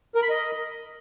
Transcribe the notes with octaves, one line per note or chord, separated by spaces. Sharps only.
A#4
B5
D#5